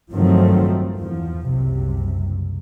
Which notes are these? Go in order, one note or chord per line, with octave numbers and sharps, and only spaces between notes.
G2 D#3 F3 F#3 A3 C4
E2 F3
F#1 C2 C3